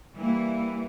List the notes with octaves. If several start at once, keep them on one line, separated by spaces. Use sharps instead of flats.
E3 G3 A#3 E4